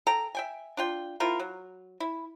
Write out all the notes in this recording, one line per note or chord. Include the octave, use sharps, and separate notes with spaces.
A4 G5 A#5
E5 G5 G#5
D4 F4 G5
C4 E4 F4 A#4
F#3
E4